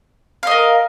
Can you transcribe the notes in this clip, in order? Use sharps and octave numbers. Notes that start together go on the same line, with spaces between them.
A#4 D#5 F5